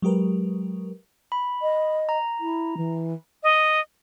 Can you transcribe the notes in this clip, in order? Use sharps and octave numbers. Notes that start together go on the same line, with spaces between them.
F#3 G#3 G4 A#4 B4
B5
D#5
A#5
E4
E3
D#5